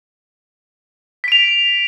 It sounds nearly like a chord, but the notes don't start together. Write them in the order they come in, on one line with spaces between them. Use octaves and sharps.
B6 D7 F7